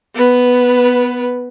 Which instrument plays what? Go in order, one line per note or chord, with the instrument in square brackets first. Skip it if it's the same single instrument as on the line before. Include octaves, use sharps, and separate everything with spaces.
[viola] B3 B4